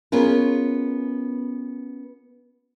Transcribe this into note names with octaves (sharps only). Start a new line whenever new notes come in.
B3 C#4 F4 G#4 A#4